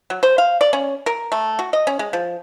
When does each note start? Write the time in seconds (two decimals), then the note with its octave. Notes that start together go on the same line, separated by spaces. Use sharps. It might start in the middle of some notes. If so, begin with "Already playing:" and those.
0.10 F#3
0.23 C5
0.38 F5
0.61 D5
0.73 C#4
1.06 A#4
1.32 A3
1.59 F#4
1.73 D#5
1.87 C#4
1.99 G#3
2.13 F3